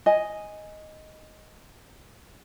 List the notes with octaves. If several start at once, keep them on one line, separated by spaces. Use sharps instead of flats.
D#5 G#5